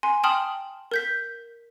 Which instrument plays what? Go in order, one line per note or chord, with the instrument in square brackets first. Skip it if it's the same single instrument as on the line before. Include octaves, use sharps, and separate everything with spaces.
[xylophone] G#5 C6
G5 A5 C6 D#6 F6 F#7
A#4 G6 B6